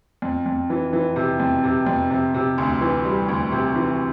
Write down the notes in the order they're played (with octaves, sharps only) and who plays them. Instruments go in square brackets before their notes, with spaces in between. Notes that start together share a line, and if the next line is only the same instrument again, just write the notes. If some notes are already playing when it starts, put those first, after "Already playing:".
[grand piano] F2
F2
E3
E3
C3
F2
C3
F2
C3
C3
D2
E3
G3
D2
C3
E3